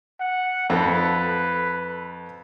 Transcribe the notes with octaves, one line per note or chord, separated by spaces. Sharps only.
F#5
F2 A4 B4